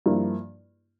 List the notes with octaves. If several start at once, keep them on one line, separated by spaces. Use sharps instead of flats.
G2 F3 A#3 E4